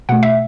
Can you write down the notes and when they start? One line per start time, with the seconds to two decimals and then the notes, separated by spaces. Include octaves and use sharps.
0.09 B2 A3 F#5
0.23 E5